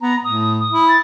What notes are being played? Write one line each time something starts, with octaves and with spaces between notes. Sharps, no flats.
B3 A#5
A2 D#6
D#6
E4
A6